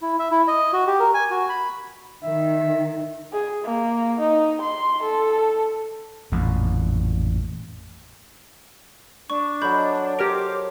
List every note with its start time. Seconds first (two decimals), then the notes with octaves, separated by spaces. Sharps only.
0.02 E4
0.19 E5
0.31 E4
0.48 D#5
0.73 F#4
0.87 G4
1.00 A#4
1.14 G#5
1.31 F#4
1.49 B5
2.23 D#3 E5
3.33 G#4
3.64 A#3
4.20 D#4
4.62 C6
5.03 A4
6.32 A1 F2 A#2
9.30 D4 C#6
9.62 F#3 A4 D#5 B5 G6
10.19 G4 A#4 C5 C#5 D6 F6 D7